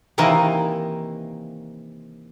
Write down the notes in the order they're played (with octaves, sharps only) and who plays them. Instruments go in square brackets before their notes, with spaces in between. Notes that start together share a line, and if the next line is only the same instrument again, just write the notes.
[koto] C3 D#3 E3 A#3 A#4 D#5